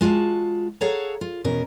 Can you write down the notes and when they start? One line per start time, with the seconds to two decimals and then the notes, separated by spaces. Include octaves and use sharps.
0.01 G#3 F4 F#4 A5
0.81 G#4 A4 C#5 F5 F#5 A#5
1.21 F4
1.44 E2 B2 C#4 A#4